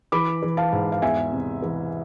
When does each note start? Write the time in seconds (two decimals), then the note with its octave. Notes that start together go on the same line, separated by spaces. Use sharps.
0.12 E3 B5 D6
0.42 E3
0.57 F5 A5
0.73 G#2
0.92 F5
1.02 E2 E5 G#5
1.32 C3
1.62 E3